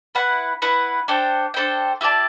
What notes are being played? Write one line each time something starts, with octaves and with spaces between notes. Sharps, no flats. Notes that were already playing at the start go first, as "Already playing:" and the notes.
E4 B4 F#5
E4 B4 F#5
D4 A4 C5 G5
D4 A4 C5 G5
E4 G4 D5 A5